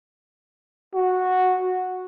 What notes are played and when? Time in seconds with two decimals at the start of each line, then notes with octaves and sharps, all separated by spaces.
0.95 F#4